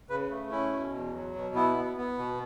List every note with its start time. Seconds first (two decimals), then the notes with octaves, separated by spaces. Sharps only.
0.10 C#3 B4
0.30 A3
0.51 C#4 E4
0.72 B2
0.93 E2
1.14 F#3
1.35 B2
1.55 B3 E4
1.77 B3
1.97 B3
2.18 B2